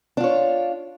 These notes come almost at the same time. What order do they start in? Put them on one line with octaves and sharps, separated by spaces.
D4 F4 C#5